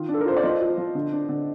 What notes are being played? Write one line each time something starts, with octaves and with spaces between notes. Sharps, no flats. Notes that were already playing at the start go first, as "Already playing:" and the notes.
Already playing: D#3 F4
D4
A4
A#4
F4 C5
D5
F3 C5 D#5
F4
F3
D3
D4
D3